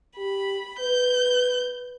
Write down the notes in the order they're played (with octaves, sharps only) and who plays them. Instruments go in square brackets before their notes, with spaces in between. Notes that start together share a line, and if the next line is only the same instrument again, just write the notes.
[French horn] G4 [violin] B5
[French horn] B4 [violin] G6